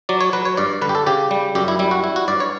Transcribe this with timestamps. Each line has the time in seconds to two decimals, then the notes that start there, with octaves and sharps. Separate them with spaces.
0.09 F#3 D5
0.21 C#5
0.33 F#3 B4
0.45 C#5
0.57 G2 D5
0.81 D3 B4
0.89 G4
0.95 A4
1.06 C#3 G4
1.31 G3
1.55 F#2 G4
1.68 E4
1.79 G3 E4
1.91 F#4
2.04 E4
2.16 F#4
2.28 G2 D5
2.40 C#5